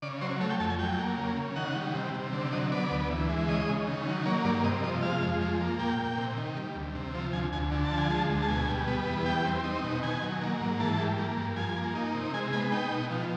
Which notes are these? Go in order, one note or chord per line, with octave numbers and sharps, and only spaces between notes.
C#3 D5
F#3 C5
A3 C#5
G5
F2 A5
G#5
F#3 G5
A#3
C#3
C#3
D#3 F#5
G3
C3
C3
D3
F#3 D#5
B3 D5
D2
E3
G#3
C#3 D#5
C#3
D#3
F#3
A#3 C#5
G2 D5
C3 D#5
F3 D#5
G#3 F5
F2
F3
A#3
A#2 G5
A#2
C3
D#3
G3
D2
C3
F3
D2 G#5
D2 G#5
D3
A5
F3
G#5
G#3 A5
D2
A5
B2 G#5
G3
B3
E2
G3 G5
C4
D#4
B2
D#3 G#5
F#3
A#3
G#2
E3 A5
G3
A#3
G2
F3 G#5
A#3
D#4
C3
G#3 G#5
B3 G#5
D#4 G5
B2
F3